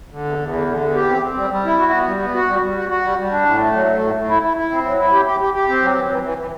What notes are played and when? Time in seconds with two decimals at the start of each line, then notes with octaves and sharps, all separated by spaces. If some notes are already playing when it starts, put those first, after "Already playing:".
0.11 D3
0.25 E2
0.39 E2
0.53 D3
0.67 D3
0.81 E2
0.95 G4
1.08 C4
1.22 C4
1.37 G3
1.50 G3
1.65 E4
1.78 F#4
1.92 B3
2.05 G3
2.20 B3
2.34 F#4
2.48 G3
2.62 G3
2.76 F#4
2.89 F#4
3.04 G3
3.18 G3
3.31 D4
3.46 A2
3.59 A3
3.73 F#3
3.87 A3
4.01 A2
4.15 A2
4.29 E4
4.42 E4
4.57 E4
4.71 C4
4.84 F#3
4.98 E4
5.12 G4
5.26 G4
5.40 G4
5.54 G4
5.68 C4
5.82 F#3
5.96 E3
6.09 E3
6.23 E3
6.38 E3